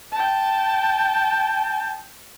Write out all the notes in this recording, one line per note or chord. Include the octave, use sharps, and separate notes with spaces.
G5 A5